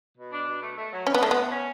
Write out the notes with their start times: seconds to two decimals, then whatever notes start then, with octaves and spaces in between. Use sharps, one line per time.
0.17 B2
0.31 D4
0.46 B2
0.61 A3
0.76 A3
0.92 F#3
1.06 E2 C#4
1.14 B3
1.21 D3 A3
1.31 B3
1.36 A2
1.51 C#4